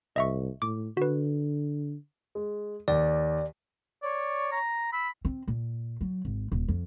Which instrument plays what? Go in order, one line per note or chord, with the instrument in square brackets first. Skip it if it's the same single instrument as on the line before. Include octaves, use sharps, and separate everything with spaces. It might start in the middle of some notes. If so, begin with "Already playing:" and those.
[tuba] C2 [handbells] D#5 E5 C#6
[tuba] A2 [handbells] D6
[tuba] D3 [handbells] F#4 B4
[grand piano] G#3
[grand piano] D#2 [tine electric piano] D5
[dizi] C#5 [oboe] D5
[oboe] A#5
[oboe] B5 [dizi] E6
[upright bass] C4
A#2
F#3
G#1
D#1
F2